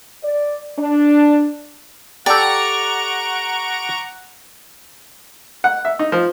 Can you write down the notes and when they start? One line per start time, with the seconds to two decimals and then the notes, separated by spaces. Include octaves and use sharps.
0.24 D5
0.79 D4
2.26 G4 A4 D5 F#5 A#5 C#6 D7
5.64 F#5
5.85 E5
5.99 D#4
6.12 F3